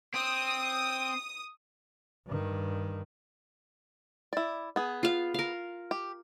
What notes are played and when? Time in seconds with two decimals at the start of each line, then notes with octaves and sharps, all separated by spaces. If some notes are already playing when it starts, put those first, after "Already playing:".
0.14 C4 D#6
2.27 G2 D#3
4.33 E4 D5
4.76 B3 G#4
5.03 F4 F5
5.34 A#4 F5
5.91 G4